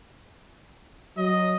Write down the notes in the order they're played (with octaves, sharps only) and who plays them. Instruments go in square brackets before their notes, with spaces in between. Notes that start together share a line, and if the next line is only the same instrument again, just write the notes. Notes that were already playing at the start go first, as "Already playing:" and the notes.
[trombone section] F#3 [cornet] D#5